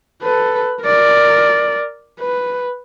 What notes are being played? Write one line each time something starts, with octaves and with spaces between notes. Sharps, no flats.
A4 B4
A#4 D5
B4